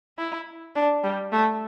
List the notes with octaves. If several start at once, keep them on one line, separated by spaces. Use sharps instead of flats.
E4
D4
G3
A3